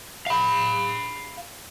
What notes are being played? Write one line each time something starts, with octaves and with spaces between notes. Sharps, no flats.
F5 B5